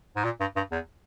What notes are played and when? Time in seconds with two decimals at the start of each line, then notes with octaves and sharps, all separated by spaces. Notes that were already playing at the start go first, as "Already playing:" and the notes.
0.16 G#2
0.24 A#2
0.40 G2
0.56 G2
0.72 E2